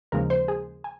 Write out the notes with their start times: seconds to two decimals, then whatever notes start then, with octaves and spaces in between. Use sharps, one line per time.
0.12 D#2 C#3 F3 G#3 A#4
0.30 C5
0.48 G#4
0.84 G#5